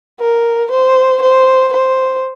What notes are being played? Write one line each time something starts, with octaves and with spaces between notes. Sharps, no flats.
A#4
C5
C5
C5